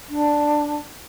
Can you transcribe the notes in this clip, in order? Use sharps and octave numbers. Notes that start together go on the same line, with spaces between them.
D4